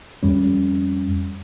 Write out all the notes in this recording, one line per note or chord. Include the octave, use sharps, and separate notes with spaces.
F2 G3 C#4